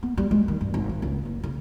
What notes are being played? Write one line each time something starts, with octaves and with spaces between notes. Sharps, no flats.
B3
G3
G#3
D#3
G2
G#1
D#3
C#2
F#1
C#3